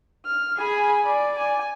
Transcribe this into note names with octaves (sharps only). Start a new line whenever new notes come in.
F6
G#4 G#5 B5
D5
G#5